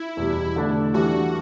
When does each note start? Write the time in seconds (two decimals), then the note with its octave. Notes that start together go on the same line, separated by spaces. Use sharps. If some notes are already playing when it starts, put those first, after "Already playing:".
Already playing: E4
0.17 E2 B2 G3
0.56 D3 A3 D4 A4
0.94 E3 G3 D4 F#4